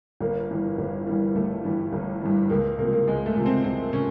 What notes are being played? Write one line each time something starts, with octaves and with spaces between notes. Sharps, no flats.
G1 A#3
G2 E3 G3
G1
G2 E3 G3
G1 A3
G2 E3 G3
G1
G2 E3 G3
C#2 A#3
C3 F3 A#3
A#3
C#2 G#3
A3
C3 F3
C4
C#2 C4
C3 C#4